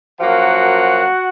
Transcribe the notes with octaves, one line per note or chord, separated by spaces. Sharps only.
F#2 F3 A#3 F#4 F#5